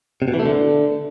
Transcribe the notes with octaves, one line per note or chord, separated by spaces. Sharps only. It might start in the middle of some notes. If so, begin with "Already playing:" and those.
C3
B2
E3
A3
D3